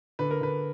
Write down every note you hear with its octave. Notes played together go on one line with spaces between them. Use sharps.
D3 B4
A#4
D3 B4